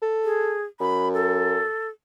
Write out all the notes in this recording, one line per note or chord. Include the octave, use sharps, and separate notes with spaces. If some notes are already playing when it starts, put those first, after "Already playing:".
A4
G#4
F#2 B5
A4